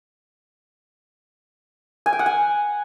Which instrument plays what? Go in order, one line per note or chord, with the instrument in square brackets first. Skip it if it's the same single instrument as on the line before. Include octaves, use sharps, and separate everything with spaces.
[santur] G#5
G5
F#5
G#5